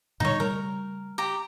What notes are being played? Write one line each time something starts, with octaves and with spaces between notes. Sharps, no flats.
A#2 D3 G3 D#4 C#5
C#3 G3 A3 A#4
G4 A#5